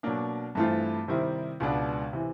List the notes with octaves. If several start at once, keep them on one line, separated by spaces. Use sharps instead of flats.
B2 F#3 A#3 D4
G2 E3 A3 C4 F4
C3 D#3 G3 C4 E4
C#2 B2 G#3 B3 D4
C3 E3